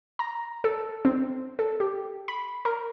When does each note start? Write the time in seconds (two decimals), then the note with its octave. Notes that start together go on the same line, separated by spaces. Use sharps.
0.19 A#5
0.64 A4
1.05 C4
1.59 A4
1.80 G4
2.28 B5
2.65 A#4